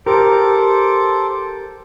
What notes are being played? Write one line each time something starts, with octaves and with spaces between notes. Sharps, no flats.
G4 A4 A#4 C5 D6